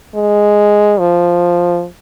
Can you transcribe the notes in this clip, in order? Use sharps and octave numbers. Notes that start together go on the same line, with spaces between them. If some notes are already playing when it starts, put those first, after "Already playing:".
G#3
F3